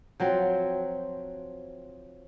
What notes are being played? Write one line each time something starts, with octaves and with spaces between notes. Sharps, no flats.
F3 F#3 C4